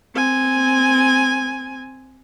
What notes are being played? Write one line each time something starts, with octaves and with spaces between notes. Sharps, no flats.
C4 G#5